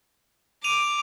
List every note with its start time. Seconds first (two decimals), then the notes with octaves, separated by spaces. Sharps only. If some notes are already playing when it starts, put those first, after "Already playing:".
0.64 D6 D#7 F7